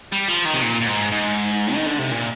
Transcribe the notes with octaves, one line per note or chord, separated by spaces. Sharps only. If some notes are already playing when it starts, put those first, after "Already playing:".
G3
F3
D#3
C3
A#2
A#2
G#2
G#2
D#3
D3
C3
A#2